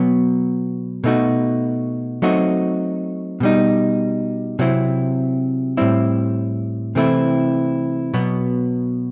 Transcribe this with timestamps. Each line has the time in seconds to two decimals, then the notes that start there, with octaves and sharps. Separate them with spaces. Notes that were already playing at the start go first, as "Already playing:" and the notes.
Already playing: B2 F#3 B3
1.04 B2 A3 D#4 F#4
2.22 F#3 A3 C4 D#4 F#4
3.40 B2 G3 D#4
4.59 C3 F#3 C4 E4
5.77 A2 G3 C4 E4
6.95 C3 E3 A3 C4 E4
8.14 B2 F#3 B3